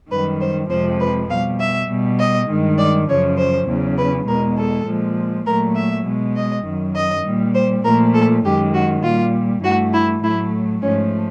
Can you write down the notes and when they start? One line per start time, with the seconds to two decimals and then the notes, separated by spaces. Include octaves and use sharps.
0.10 F#2 D#3 G3 B4
0.41 C5
0.70 F2 C3 F3 G#3 C5
1.00 B4
1.30 B2 G3 F5
1.59 E5
1.89 B2 G3
2.19 D#5
2.48 G2 D#3 G#3
2.78 D5
3.09 F#2 C#3 F3 C#5
3.37 C5
3.68 E2 C#3 F#3
3.98 B4
4.27 E2 B2 G#3 A#4
4.57 A4
4.87 A#2 F3 G#3
5.46 A#2 F#3 A3 A#4
5.75 E5
6.06 B2 G#3
6.36 D#5
6.66 F#2 D#3 F#3
6.96 D#5
7.25 A#2 G3
7.54 C5
7.84 A#2 F3 A3 A#4
8.14 A4
8.44 F#2 D#3 G#3 G4
8.73 F#4
9.03 A#2 G3 F4
9.63 G2 E3 A3 F#4
9.93 E4
10.22 A2 F#3 A3 E4
10.82 G#2 F3 A3 C#4